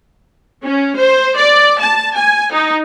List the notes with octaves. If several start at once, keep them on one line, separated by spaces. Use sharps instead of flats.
C#4
C5
D5
A5
G#5
D#4